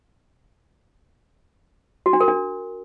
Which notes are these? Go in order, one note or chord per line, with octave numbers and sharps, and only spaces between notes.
F#4
D4
A#4
D4